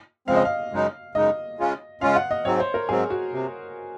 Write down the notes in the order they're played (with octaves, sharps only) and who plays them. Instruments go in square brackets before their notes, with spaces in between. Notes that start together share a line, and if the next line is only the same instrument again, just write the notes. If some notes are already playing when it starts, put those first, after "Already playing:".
[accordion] C#3 F3 G#3 C4 [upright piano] F5
[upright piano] D#5
F5
[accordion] F#2 C#3 G#3 D#4
[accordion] F#2 C#3 G#3 D#4 [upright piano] D#5
[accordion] C#3 G#3 C#4 F4
[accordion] C#3 G#3 C#4 F4 [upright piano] F5
[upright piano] F#5
D#5
[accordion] G#2 F#3 C4 [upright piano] C#5
[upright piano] C5
A#4
[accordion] G#2 F#3 C4 [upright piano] G#4
[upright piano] F#4
[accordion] C3